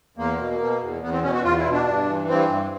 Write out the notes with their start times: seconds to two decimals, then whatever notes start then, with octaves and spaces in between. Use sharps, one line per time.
0.17 E2 A#3
0.39 B2
0.60 B2
0.81 E2
1.03 E2 B3
1.12 C4
1.23 B2 C#4
1.33 F#4
1.44 E2 F4
1.58 E4
1.66 B2
1.73 D4
1.86 G2
2.08 E3
2.29 G2 C4
2.50 G2